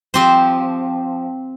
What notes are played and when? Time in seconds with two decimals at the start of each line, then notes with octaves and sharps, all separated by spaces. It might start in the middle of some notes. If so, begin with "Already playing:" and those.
0.14 F3 C4 G4 C5